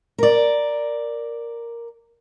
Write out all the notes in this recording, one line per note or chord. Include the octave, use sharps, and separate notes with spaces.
A#4 D5